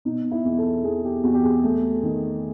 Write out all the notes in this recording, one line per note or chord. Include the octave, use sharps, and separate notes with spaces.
B2 D#4
E4
E2
A4
E2 G#4
G4
E2 F#4
G4
G#4
A3
D#3